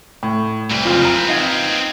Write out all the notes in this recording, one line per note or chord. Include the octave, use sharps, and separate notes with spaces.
A2
C2 C4 B4
F#1 F2 F4
A#5
D#4 F5 G#6